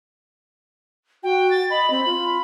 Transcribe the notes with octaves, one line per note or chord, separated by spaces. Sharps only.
F#4 G5
A6
D#5 B5
C4 B5
F4